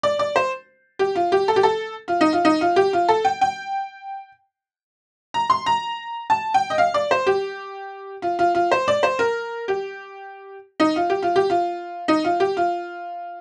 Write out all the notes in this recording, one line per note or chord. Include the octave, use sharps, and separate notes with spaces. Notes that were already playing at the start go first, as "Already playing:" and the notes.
D5
D5
C5
G4
F4
G4
A4
G4
A4
F4
D#4
F4
D#4
F4
G4
F4
A4
G5
G5
A#5
C6
A#5
A5
G5
D#5
F5
D5
C5
G4
F4
F4
F4
C5
D5
C5
A#4
G4
D#4
F4
G4
F4
G4
F4
D#4
F4
G4
F4